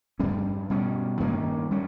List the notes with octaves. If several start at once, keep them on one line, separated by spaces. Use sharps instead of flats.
G2 G3 C#4
B2 G3 C#4
G2 D#3 A#3 C#4
G3 C#4